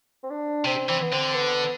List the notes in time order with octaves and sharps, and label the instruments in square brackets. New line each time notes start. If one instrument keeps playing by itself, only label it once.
[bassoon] C4
D4
[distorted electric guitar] C3 [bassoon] C4
[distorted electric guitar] E3 [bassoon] C4
[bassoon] B3
[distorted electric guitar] D3 [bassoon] C4
[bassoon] B3